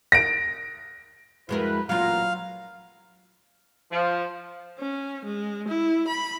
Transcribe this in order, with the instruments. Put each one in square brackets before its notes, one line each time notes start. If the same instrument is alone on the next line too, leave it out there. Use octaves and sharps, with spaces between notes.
[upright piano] A#6 D7
[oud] F2 G#3 A#4 [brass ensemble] E4 F#4 B4
[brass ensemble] A1 A#2 A#5 [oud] F#3 F4 [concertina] F5
[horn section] F3
[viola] C#4
G#3
E4
B5